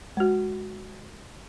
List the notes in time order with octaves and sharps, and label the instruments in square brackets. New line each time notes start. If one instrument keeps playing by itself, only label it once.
[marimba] G#3 F#4